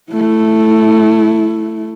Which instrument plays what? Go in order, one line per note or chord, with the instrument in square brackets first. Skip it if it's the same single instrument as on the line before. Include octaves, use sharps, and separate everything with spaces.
[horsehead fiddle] A3 E4